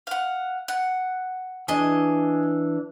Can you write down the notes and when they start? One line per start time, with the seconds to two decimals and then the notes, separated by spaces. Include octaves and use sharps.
0.07 F5 F#5
0.68 F#5
1.68 E3 D4 G#4 D#5